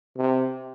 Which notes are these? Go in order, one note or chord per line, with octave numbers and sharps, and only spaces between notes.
C3